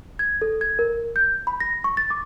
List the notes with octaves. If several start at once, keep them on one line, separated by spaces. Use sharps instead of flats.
G#6
A4
G#6
A#4
G6
B5
A#6
C#6
A6
D6